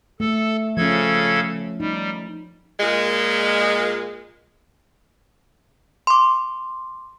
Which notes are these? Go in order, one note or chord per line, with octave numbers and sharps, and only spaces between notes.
A3 A4
C#3 F3 C#4 A4 G#6
G3 D#4
A#2 G#3
C6 D6